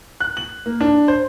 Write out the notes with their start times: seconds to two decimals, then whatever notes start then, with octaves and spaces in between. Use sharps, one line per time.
0.20 F#6
0.37 F#7
0.66 A#3
0.81 D4
1.08 C5